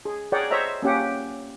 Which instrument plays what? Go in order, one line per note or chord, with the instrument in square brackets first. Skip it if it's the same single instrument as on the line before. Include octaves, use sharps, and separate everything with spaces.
[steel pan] G#4
G#4 A#4 C#5 D5 F#5 G5
C5 C#5 D#5 E5 A#5
A#3 C#4 G4 F#5